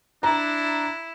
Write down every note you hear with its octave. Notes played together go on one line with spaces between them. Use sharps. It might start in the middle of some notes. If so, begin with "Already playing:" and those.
D4 E4 A#5